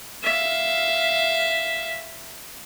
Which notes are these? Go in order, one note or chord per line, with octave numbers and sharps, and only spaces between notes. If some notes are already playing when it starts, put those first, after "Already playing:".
E5 F5